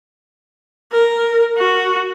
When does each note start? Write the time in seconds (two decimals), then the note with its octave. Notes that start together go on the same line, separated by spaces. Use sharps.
0.92 A#4
1.57 F#4